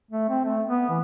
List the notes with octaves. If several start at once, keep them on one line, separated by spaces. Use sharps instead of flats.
A3
C4
A3
B3
E3